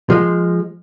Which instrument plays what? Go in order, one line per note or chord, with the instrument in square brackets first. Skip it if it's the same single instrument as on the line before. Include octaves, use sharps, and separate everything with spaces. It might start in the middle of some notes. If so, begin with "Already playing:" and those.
[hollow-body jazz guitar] F3 G#3